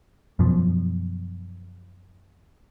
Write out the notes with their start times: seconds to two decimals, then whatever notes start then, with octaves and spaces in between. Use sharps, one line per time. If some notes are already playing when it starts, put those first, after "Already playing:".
0.39 F#2 B2 F3